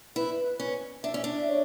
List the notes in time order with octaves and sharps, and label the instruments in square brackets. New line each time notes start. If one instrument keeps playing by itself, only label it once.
[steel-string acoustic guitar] E4 [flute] B4
[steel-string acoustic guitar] C#4
[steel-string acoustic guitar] D4 [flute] E5
[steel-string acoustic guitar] C#4
D4
[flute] C#5